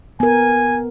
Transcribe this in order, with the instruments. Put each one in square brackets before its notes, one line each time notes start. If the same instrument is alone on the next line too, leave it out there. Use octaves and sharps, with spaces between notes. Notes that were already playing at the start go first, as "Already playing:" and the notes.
[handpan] B3 A#4 [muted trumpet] G#5